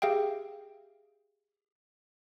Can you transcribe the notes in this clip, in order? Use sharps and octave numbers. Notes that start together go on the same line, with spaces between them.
G4 G#4 E5 F5 G5